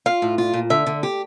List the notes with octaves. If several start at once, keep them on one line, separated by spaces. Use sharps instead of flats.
F4 F5
A2
F4
A#2
D3 E5
D3
G4